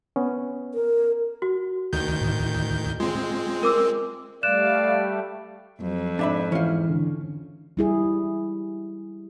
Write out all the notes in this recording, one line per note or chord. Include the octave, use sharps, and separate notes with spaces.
B3 C#4
A#4
F#4
D2 D#3 G6
A2
G#3 C4 F4
A#4 D6 E6
G3 A3 D5 F5 F#6 E7
F2 F#3
G#2 D4 E5 B5
E3 C#4 F4
D3
G3 E4 G#4